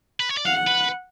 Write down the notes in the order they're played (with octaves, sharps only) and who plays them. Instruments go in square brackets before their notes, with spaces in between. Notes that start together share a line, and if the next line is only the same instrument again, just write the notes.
[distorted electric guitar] B4
C#5
D5
[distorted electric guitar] F5 [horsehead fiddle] F#5
[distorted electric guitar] B4